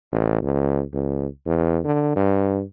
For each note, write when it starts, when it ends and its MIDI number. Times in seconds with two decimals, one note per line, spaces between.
0.12 0.42 33
0.42 0.83 37
0.93 1.27 37
1.46 1.79 40
1.84 2.14 50
2.16 2.62 43